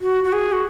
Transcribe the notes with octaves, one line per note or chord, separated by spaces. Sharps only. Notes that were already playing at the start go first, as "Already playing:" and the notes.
F#4
F#4
G#4
F#4